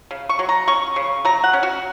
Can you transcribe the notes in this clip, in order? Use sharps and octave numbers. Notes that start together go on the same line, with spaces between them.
C#3
C#6
F#3
A#5
C#4 C#6
C#3
F#3 A#5
F#5
C#4
F#4